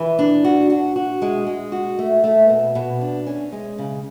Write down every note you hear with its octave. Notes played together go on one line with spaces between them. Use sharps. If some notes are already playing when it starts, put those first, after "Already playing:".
Already playing: E3
D4
F#4
F#4
F#4
G#3
G#3
F#4
A3
A3
B2
B2
D4
C#4
G#3
C#3